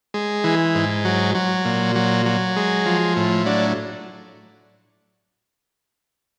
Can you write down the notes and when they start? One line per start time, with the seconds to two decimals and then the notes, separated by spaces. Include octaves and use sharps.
0.14 G#3
0.44 E3
0.75 G#2
1.05 F#3
1.35 F#3
1.65 A#2
1.96 F#3
2.26 F#3
2.56 G#3
2.86 F3
3.16 A2
3.46 F#3 D4